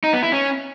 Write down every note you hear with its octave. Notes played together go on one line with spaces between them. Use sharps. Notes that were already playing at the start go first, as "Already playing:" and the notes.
D#4
B3
E4
C#4